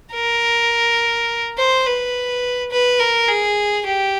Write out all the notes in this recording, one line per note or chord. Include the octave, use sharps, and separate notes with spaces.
A#4
C5
B4
B4
A#4
G#4
G4